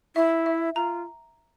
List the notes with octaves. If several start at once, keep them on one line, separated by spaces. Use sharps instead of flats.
E4 E5
E5
F4 A#5